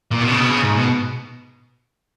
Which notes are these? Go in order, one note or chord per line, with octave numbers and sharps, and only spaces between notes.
A#2
B2
C#3
B2
C#3
G#2
B2